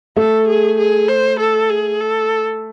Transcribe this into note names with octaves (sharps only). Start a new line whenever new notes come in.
A3 A4
G#4
G#4
C5
A4
G#4
A4